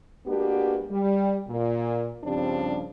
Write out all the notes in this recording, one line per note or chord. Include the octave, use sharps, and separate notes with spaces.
G#3 A#3 B3 D4 F#4 G4
G3
A#2
G2 C#3 F3 G3 C4 D4